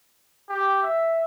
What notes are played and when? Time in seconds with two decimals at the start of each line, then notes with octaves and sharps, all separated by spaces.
0.49 G4
0.82 E5